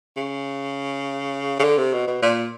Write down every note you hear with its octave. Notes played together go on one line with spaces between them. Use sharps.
C#3
C#3
D3
C3
B2
B2
A#2